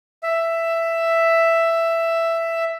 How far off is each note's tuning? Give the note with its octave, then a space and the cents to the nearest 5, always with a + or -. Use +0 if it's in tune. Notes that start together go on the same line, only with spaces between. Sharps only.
E5 +10